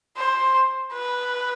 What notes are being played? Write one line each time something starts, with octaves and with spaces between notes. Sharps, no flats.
C5
B4